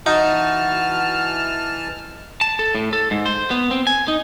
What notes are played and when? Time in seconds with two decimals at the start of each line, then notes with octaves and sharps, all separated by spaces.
0.06 E3 D#4 F#4 A5 F6
2.41 A5
2.59 A4
2.75 A2
2.93 A4
3.11 G#2
3.26 C5
3.51 B3
3.71 C4
3.87 G#5
4.08 D#4